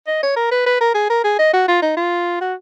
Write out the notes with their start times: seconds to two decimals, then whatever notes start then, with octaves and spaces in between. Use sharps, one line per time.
0.07 D#5
0.23 C#5
0.36 A#4
0.51 B4
0.66 B4
0.81 A#4
0.94 G#4
1.10 A#4
1.24 G#4
1.39 D#5
1.54 F#4
1.68 F4
1.82 D#4
1.97 F4
2.41 F#4